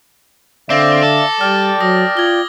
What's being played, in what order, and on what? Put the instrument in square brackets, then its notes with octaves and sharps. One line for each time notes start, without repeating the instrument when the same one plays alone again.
[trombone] D3 [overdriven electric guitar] C4 [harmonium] D5 E5 F5 [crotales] D6 A#6
[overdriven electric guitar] A4
[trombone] G3 [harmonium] D5 G5 [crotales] F6
[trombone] F#3 [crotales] D#6 A#6
[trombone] F4 [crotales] G#6 G7